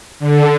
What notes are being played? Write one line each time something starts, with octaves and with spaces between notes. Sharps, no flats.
D3